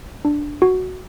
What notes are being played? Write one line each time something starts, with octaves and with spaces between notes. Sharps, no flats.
D4
F#4